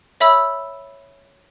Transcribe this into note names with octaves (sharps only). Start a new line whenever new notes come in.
C#5 E5 B5 E6